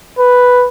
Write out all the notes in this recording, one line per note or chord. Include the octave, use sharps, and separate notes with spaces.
B4